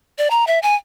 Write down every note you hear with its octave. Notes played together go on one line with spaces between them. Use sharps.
D5
A#5
E5
G#5